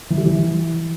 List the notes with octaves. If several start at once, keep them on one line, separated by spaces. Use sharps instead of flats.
E3
G3
E3